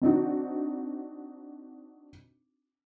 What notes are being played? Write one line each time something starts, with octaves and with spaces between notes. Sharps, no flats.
C4 D4 D#4 F#4